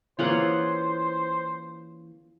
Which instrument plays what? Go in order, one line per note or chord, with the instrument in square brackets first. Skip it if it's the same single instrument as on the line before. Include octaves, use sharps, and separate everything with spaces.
[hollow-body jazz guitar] E3 A#3 C#4 [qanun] F4 G#4 F#5 [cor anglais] C5